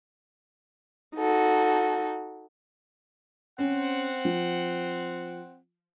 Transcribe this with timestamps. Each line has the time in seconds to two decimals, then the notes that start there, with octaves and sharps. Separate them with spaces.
1.16 D#4 F#4 A4
3.59 C4 C#4 F#5
4.25 F3